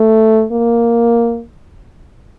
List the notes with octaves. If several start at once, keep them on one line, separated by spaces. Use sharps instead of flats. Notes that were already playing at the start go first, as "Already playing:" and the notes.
Already playing: A3
A#3